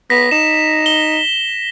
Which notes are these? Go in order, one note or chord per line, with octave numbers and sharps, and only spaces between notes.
B3 A#6 B6
D#4 E7
G7